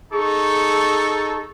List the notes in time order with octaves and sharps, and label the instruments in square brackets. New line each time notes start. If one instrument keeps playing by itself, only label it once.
[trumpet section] D#4 A4 C#6 [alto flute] G#4